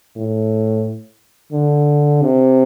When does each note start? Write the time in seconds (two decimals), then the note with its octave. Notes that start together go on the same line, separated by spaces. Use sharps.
0.16 A2
1.52 D3
2.22 C3